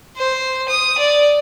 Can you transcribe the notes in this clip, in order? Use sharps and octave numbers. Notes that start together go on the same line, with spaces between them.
C5
D#6
D5